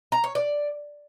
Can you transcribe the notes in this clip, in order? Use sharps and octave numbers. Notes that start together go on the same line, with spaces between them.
A#5
C#5
D5